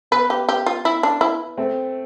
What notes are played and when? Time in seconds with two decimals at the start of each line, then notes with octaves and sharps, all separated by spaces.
0.12 B3 B4
0.30 G4
0.49 G4
0.66 F4
0.85 E4
1.03 D4
1.21 E4
1.57 A3 C4